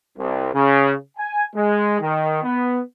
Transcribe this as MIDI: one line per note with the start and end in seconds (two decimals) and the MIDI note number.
0.18 0.49 36
0.54 0.92 49
1.18 1.45 80
1.55 1.98 56
2.00 2.41 51
2.43 2.80 59